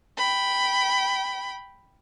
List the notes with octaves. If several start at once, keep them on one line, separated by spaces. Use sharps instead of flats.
G5 B5